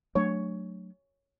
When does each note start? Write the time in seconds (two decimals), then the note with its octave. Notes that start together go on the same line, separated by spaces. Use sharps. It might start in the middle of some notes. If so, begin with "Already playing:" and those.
0.15 F#3 A3 D4 C#5